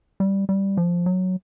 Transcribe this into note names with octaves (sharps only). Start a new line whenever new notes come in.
G3
G3
F3
F#3